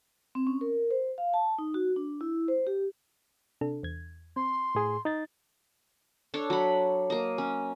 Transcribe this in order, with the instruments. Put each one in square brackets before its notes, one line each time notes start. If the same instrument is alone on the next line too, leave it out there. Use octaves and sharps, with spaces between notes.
[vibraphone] C4
C#4
A#4
C5
F5
A5
D#4
F#4
D4
E4
C5
G4
[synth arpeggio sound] C3 D4 A4
E2 G#6
[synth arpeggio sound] C4 [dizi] C6
[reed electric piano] A2 G#4
D#4 A6
[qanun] D4 A4 C#5
F#3 B5
A#3 D#5
C#4